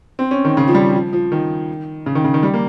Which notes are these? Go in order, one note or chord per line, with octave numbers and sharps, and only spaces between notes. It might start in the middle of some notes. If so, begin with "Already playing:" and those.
C4
C#4
D#3
C#3
F3
G3
F3
F3
D#3
C#3
D#3
C#3
D#3
G3
A#3